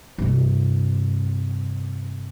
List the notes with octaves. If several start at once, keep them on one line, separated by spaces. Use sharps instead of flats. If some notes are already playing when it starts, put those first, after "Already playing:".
G2 C3